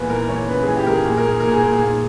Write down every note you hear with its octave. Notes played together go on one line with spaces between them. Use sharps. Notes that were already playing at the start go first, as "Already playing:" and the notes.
Already playing: E2 A#2 B4
E3 A#4
E2 C#5
C#3 B4
E3 G#4
G4
E2 G#4 A#4
A#2 G#4
A#4
A#2 G#4
A#2 A#4
G#4
A#2 A#4
G#4
A#2